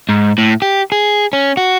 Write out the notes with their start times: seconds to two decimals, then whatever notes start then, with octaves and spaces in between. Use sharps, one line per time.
0.09 G#2
0.38 A2
0.62 G4
0.92 G#4
1.33 C#4
1.57 F#4